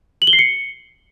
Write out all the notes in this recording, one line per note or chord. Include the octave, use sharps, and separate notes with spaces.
F#7
G7
C7
C#7